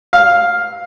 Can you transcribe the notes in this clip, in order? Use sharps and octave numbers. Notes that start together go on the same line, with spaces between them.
F5